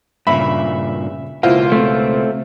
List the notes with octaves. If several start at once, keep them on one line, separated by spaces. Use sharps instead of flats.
G2 A#2 C#3 E5 B5
C#2 B2 A#3 E4 F4 C5
A3 C4